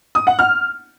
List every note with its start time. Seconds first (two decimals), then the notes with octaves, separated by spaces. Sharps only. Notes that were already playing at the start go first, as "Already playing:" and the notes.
0.15 D#6
0.27 F#5
0.39 F6